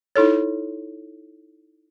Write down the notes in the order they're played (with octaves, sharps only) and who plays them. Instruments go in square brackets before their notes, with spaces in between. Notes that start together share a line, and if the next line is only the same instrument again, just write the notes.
[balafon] D#4 E4 A4 C#5